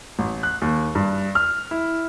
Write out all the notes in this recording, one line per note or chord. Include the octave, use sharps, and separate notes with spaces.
A1
F#6
D#2
G2
F6
E4